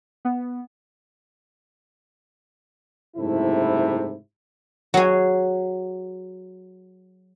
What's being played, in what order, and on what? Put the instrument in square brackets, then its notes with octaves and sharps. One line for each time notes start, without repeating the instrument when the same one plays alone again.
[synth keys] B3
[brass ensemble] F#1 G#2 C3 A3 E4
[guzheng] F#3 G#4